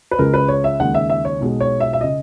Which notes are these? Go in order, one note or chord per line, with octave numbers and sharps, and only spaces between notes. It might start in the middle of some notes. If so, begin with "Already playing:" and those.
B4
C#2 C#3 G#3 A#4
B4
C#5
E5
D#2 C#3 G#3 F#5
E5
E5
C#5
B1 B2 G#3
C#5
E5
E5
C#3 D#5